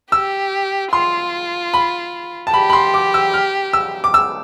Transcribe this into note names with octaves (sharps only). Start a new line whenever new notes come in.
G4 E6
F4 C6
B5
A5
G4 B5
B5
C6
D6
E6
F6
E6
D6
E6